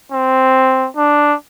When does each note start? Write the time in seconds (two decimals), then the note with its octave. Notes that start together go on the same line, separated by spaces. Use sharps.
0.12 C4
0.96 D4